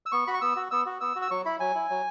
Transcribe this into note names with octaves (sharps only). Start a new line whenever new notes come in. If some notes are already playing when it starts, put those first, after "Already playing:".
E6
B3 C#6
F#4 B5
C#6
B3 E6
F#4
B3 E6
F#4
B3 E6
F#4
E6
F#3 C#6
E4 B5
F#3 G#5
E4
F#3